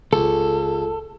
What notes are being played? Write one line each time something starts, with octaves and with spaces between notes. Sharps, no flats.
C#2 A4